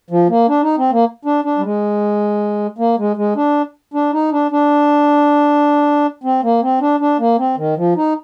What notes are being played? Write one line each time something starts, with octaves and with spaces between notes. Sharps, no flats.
F3
A#3
D4
D#4
C4
A#3
D4
D4
G3
G#3
A#3
G#3
G#3
D4
D4
D#4
D4
D4
C4
A#3
C4
D4
D4
A#3
C4
D#3
F3
D#4